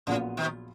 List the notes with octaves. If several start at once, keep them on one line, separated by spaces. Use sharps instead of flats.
A#1 A#2 C#3 F#3 B3 F4
B2 D#3